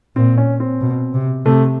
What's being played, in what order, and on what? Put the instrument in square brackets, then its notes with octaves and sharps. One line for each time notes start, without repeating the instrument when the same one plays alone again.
[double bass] A#2 [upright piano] C4
[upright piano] C#4
C4
[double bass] B2
C3
[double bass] C3 [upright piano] A3